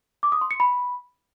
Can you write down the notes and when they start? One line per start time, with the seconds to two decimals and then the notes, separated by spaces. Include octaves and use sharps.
0.23 D6
0.32 D#6
0.41 C6
0.51 C#7
0.60 B5